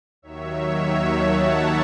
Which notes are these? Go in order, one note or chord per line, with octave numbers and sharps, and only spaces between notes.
D#2 D#3 F#3 C#5 E5
F#5 A5